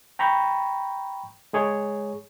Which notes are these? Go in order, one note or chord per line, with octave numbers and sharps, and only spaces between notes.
G5 A#5 B5 C#6 G6
G#3 G#4 C#5